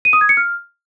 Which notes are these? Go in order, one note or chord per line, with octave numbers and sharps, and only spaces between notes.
D#7
D#6
G#6
C#7
F6